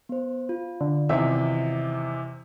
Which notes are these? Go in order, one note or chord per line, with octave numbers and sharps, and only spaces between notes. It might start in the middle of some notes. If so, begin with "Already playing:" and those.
B3 C5
F4
D3
E2 C3 D#3 E5